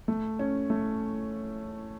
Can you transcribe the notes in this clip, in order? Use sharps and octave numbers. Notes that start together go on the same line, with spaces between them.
A3
C#4
A3